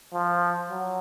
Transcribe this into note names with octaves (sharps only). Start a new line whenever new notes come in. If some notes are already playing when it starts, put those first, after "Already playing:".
F3
F#3